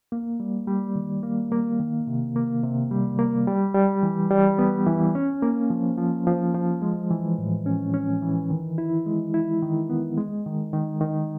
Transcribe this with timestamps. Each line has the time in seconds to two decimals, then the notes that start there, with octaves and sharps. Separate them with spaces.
0.12 A#3
0.40 G3
0.67 G3
0.96 D#3
1.23 A#3
1.52 A#3
1.80 D#3
2.07 C3
2.36 A#3
2.63 C3
2.91 G3
3.19 A#3
3.48 G3
3.75 G3
4.03 E3
4.30 G3
4.59 B3
4.87 E3
5.15 C#4
5.43 A#3
5.70 F3
5.98 F3
6.27 F3
6.55 F3
6.82 G#3
7.10 E3
7.38 A2
7.66 C#4
7.94 C#4
8.22 E3
8.50 D#3
8.78 E4
9.06 G#3
9.34 E4
9.62 D#3
9.90 B3
10.17 G#3
10.46 D#3
10.73 D#3
11.01 D#3